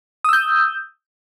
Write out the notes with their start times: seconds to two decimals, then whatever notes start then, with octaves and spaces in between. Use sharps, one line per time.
0.24 D#6
0.29 E6
0.33 G6